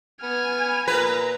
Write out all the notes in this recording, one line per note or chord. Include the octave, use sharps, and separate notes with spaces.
B3 G#5 F6
A#2 B4 A#5